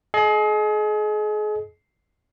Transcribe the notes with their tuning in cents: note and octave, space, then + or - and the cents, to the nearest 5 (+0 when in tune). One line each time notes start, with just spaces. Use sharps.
G#4 +35 D#5 +0